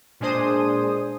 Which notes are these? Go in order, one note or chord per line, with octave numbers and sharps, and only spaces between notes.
A#2 G#3 D4 G#4 C5 D#6